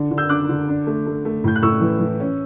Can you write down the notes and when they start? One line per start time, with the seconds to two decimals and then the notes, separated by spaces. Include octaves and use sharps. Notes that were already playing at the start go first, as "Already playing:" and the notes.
Already playing: D3
0.11 D3
0.18 E6 G6
0.29 D4 D6 F#6
0.49 D3
0.68 D4
0.87 A3
1.06 A3
1.25 A3
1.44 A2 G6
1.56 F#6
1.62 A2 C#6 E6
1.81 E3
2.00 E3
2.20 C#4